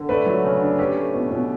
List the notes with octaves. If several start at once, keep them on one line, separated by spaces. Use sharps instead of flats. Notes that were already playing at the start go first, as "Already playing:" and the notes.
Already playing: D3
A3 B4 D5
F#3
C#3
D4
C#4 G4 B4
A3
B2
B2